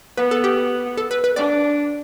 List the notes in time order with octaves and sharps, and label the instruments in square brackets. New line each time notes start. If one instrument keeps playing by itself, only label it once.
[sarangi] B3 [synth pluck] B4
[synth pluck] A4
G4
A4
B4
B4
[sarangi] D4 [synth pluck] D5